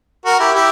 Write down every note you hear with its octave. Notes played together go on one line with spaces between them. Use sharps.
F#4 A#4
E4 G4
E4 G4